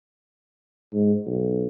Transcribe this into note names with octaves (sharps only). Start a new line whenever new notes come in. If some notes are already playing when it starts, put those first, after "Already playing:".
G#2
B1